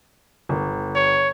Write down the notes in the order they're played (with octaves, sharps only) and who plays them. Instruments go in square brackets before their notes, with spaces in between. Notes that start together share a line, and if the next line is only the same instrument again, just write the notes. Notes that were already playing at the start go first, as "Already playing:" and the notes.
[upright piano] G1
[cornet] C#5